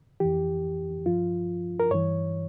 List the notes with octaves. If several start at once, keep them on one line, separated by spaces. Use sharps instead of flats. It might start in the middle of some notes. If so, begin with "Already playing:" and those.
F2 E3 G4
G2 F3 F4
A#4
G2 E3 C#5